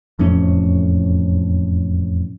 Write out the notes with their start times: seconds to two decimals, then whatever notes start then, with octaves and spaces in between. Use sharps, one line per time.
0.19 E1 F2 A2 C#4